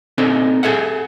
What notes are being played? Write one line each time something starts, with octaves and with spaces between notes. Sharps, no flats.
C4 D4 D#4 A4
G#4 A4 E5 F#5